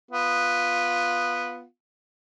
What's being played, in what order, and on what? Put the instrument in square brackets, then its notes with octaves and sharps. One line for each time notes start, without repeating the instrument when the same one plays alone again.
[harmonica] B3 F4